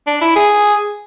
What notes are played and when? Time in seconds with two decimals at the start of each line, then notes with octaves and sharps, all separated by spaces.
0.07 D4
0.22 E4
0.36 G#4